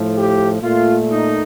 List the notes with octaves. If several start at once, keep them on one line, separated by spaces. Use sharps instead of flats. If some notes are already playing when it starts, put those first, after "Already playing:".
Already playing: A2 F3 A3
G4
A#2 A3 F4
D#4